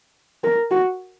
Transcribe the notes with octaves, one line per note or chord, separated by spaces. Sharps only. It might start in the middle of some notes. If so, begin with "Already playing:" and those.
A#4
F#4